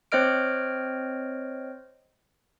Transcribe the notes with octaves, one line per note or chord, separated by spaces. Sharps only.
C4 C5 C#5 D#5 F6 D7